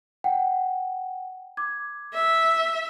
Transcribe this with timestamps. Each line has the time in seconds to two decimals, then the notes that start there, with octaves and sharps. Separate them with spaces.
0.24 F#5 G5
1.57 D6 G#6
2.13 E5